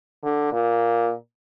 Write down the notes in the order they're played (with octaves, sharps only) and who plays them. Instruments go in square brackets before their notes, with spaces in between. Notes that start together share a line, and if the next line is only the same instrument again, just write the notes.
[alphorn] D3
A#2